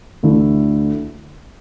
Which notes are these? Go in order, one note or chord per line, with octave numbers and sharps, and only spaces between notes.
D2 D3 A3 E4